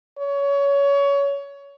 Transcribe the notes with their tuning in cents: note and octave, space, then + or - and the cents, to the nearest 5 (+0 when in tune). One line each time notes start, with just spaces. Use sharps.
C#5 +20